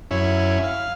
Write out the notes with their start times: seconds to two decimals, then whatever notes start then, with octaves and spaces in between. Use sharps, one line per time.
0.11 F#2 C#4 E4
0.64 F5